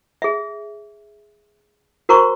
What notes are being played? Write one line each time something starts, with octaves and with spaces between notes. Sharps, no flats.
G#4 E5
F#4 A#4 C5 A#5 C6 C#6